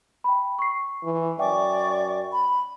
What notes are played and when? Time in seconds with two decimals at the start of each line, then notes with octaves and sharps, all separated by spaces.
0.24 G5 B5
0.59 C#6 C7
1.03 E3
1.39 F#2 D5 E5 G5 G#5 C#6 D6
2.32 B5